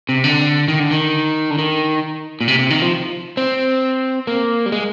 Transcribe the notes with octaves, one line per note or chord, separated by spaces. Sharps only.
C3
D3
D#3
D3
D#3
D3
D#3
A#2
C3
C3
D#3
F3
C4
A#3
G3
G#3